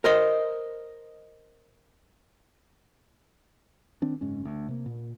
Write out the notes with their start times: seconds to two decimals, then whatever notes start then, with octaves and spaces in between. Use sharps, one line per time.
0.04 A#4 C5 D#5
4.02 D#3 C4 D4
4.21 F#1 G#2 C#4
4.45 D2
4.68 C3 A#3
4.86 A#2